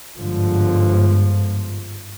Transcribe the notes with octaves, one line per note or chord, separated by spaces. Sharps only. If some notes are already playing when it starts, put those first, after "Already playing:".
G1 G#2 D3 F3